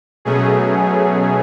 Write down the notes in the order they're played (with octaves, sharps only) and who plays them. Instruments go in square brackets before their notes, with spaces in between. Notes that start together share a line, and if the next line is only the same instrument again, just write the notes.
[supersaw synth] B2 F#3 A3 C#4 G#4